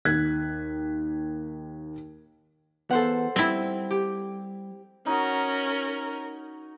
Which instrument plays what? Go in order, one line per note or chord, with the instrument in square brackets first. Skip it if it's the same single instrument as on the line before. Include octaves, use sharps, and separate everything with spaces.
[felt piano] D#2 F#6 G#6 B6
[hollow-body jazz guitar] E2 B3 [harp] A4 C5 F#5
[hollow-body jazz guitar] G3 [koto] C4 E4
[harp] G4
[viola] C#4 A#4 [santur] D#4 F#4